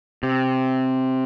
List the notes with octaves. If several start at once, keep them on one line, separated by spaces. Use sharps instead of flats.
C3